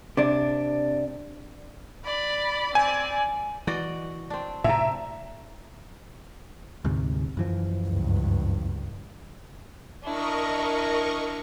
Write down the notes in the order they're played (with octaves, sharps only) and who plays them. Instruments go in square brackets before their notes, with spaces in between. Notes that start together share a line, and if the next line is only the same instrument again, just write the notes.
[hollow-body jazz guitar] C3 D4
[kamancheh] D5 B5
[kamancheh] C4 D5 [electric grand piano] G#5
[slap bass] E3 [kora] F#4 D5 D#5
[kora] C4 D4
[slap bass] A2 C3 [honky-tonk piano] E5 [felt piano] A5 A#5
[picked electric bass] D2 G#2 C3
F#2 E3 F3
[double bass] C#2 G2
[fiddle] D4 E4 [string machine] A#4 D#5 C#6